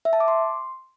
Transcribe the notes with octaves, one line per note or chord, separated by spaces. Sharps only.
E5
A5
D6
C6